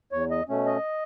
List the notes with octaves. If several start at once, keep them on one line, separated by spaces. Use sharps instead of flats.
E2 C#5
D#5
B2 A3 C#4
D#5